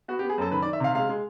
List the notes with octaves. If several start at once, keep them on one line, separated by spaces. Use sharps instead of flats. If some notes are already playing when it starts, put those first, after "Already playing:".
B3 F#4
G4
B3
G#4
F#2 A4
D#3 B4
D5
D#3
E5
C3 F5
G#3 F5
G#3